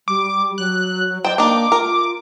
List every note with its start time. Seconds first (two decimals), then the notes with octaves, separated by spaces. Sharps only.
0.08 G3 D6
0.58 F#3 F#6
1.25 C5 D5 D#5 G5
1.38 A#3 D4 D#4 D6
1.72 F4 A#4